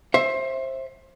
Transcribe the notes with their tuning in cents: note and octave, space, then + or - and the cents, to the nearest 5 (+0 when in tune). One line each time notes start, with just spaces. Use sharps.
C5 +25 E5 +0